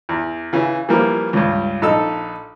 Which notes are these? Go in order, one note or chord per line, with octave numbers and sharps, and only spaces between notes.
E2
C#3 E3
E3 F3 G3 A#3
C#2 G2
A#1 D#4 A4 E6